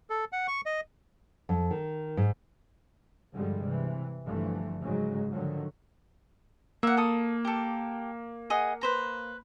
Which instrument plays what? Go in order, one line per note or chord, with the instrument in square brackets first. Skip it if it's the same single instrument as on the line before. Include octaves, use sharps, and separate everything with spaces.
[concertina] A4
F#5
C#6
D#5
[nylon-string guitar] F2
D#3
G#2
[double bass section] G2 D3 F3 G3 G#3
C3 E3
G1 G2 D3 E3 F3 A3
G#2 C#3 F#3 G#3
D3 D#3 F3 F#3
[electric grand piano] A#3 [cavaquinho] E5 F#5
[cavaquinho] A4 D#6
G4 A4
G#4 D#5 F#5
B4 C5 A#5